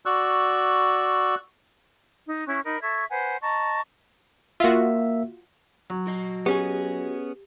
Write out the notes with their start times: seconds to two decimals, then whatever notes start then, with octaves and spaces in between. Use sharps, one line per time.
0.06 F#4 D5 C#6 E6 F#6
2.26 D#4
2.47 C#4 E4 C#6 F#6
2.64 D#4 A#4 B5
2.81 A4 E5 C#6 G#6
3.10 B4 C5 F#5 G#5
3.42 D#5 A5 A#5 C#6
4.60 A#3 F4 F#4 E5
5.90 F#3
6.07 F#4 D#5
6.46 B3 C#4 G4 G#4